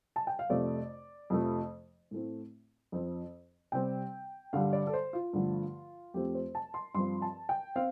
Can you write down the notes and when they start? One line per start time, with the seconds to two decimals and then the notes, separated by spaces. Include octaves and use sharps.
0.16 A5
0.27 G5
0.39 F5
0.50 F2 C3 A3 C4 D5
1.30 F2 C3 F3 A3
2.11 A2 A3 C4
2.92 F2 F3 C4
3.72 C3 G3 C4 G5
4.53 G2 D3 G3 F5
4.73 D5
4.87 A4
4.93 C5
5.13 F4
5.33 G2 D3 F3 A3
6.14 F2 F3 A3 C4 G4
6.35 C5
6.55 A5
6.74 C6
6.94 G2 F3 C4 C6
7.22 A5
7.49 G5
7.76 C4 F5